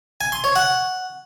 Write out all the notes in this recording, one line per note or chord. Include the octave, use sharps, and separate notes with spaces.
G#5
C6
C#5
F#5